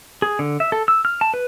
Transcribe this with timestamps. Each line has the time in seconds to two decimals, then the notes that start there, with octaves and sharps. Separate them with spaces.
0.22 G#4
0.39 D3
0.60 E5
0.72 A4
0.88 E6
1.05 F6
1.21 A5
1.34 B4